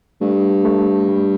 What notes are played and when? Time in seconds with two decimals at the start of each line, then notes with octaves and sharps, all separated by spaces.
0.21 G2 A3
0.65 A3
1.08 G3